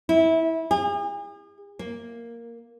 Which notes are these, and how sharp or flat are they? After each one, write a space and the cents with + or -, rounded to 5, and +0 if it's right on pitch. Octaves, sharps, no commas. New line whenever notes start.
E4 -20
G#4 -40
A#3 +0